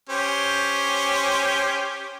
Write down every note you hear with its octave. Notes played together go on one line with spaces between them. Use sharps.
C#4 G4 C5